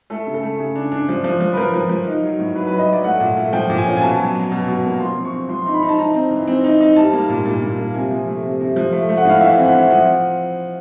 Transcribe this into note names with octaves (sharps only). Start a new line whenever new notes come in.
A3 A4
C#3
A4
A3
C#3
D4
D4
F3
F3
F3
B4
F3 A#4
F3
F3
D#4
F#3
A2
F#3 B4
B4
F#3
D#5
F#3
D5
A3 F#5
A#2
A3
F3 G5
A#2
G#5
C#4
G#5
B2 A5
F#3
F#3
B2
B2
A#3
F3 C6
C4
C#6
C4
F3 C6
D#4 C6
B5
D#4
A5
D#4 A#5
C4
E3
C4
D#4
D#4
G3 A5
A#3
A#2
A#2
A#2
A#3
C3 G#5
F3
A3
C3
C3
F3
A3
A3
F#5
A2 F5
E3 E5
C4
F#5
C4
F3 F#5